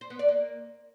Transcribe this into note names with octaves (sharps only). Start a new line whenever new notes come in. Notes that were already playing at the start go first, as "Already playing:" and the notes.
C5
B3
D5
A#3